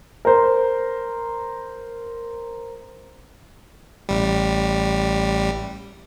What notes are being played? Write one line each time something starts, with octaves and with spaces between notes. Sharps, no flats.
A#4 C5
A1 G3